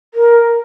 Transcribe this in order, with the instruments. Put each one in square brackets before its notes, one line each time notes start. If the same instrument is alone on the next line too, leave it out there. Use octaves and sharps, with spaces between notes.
[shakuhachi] A#4